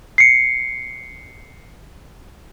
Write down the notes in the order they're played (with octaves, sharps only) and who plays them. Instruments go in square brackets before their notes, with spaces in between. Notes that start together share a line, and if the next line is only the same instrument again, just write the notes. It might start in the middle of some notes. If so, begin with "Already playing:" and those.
[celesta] C7 C#7